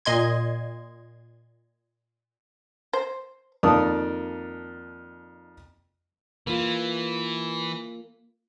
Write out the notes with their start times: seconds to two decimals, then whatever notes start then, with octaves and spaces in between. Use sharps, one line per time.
0.05 A#2 D#5 C6 G#6
2.93 C5
3.63 F2 D#3 A#3 D5 A5 D#6
6.47 E3 A#3 F4